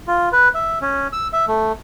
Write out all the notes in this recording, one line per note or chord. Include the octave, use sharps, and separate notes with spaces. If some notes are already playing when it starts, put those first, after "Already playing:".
F4
B4
E5
C#4
E6
E5
A3